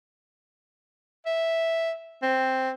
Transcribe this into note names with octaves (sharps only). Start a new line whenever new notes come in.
E5
C4